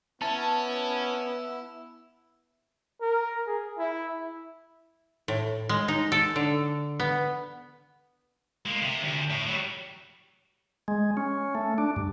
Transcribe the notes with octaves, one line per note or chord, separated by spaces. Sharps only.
B3 C#4 E4 A5 E6
A#4
G#4
E4
A2
G#3
D#4
A4
D3
B3
G#3 A#3
C3
D2
A2
F#3 G3
G#3
C#4
A3
D4
G2